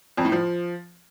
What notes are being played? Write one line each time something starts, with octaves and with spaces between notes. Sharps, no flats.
F2
A2
F3